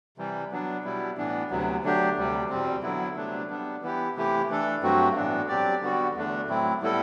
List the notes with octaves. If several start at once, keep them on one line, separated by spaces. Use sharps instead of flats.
C3 E3 G3
F#3 B3 D4
B2 G3 B3 E4
A2 E3 B3 D4
D2 C3 F#3 B3
D3 F#3 A3 D4 G4
D2 C3 G3
E2 B2 G3 C4
D3 F#3 B3 E4
C3 F#3 A3 D4
G3 B3 D4
E3 B3 E4 G4
C3 E3 A3 E4 G4
E3 A3 D4 A4
G2 F#3 A3 C4 F#4
A2 E3 B3 D4
F#3 C4 G4 D5
D3 G3 B3 F#4
E2 D3 A3 D4
A2 F#3 A3 C4 E4
A2 G3 B3 E4 A4